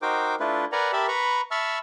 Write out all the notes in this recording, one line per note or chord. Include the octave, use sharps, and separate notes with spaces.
D#4 F#4 A#4 C5 G5 D6
A3 D4 E4 F4 B4
A#4 B4 D5 F#5 G#5 A#5
G4 A#4 E5 A5 B5
B4 A#5 B5 C#6
E5 A5 B5 C#6 E6 F6